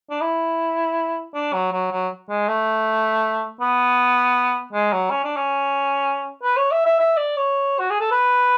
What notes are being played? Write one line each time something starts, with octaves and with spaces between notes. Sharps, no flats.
D4
E4
D4
F#3
F#3
F#3
G#3
A3
B3
G#3
F#3
C#4
D4
C#4
B4
C#5
E5
E5
E5
D5
C#5
F#4
G#4
A4
B4